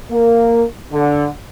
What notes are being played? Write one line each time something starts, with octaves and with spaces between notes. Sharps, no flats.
A#3
D3